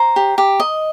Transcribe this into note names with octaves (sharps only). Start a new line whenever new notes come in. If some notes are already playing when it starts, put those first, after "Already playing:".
Already playing: C5 A#5
G4
G4
D#5